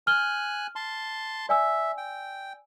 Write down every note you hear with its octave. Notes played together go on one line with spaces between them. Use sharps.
G#5 F6 F#6 G7
A5 C6
D5 E5 G#5 E6
G5